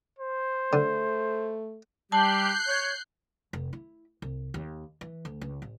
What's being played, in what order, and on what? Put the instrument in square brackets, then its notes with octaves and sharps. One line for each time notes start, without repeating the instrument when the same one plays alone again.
[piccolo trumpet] C5
[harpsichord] D3 [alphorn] A3
[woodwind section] G3 G4 [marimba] A5 [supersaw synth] F#6 G6 C7
[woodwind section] C#5
[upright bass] F1
E4
C2
D#2
E3
D2
C#2
A1